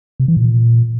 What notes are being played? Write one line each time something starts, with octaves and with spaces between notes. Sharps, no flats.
C3
E3
A#2